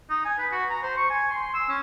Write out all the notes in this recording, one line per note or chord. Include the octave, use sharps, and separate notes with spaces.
D#4
G#5
B4
F#4
A#5
C5
C#6
G#5
C6
C6
E6
C#4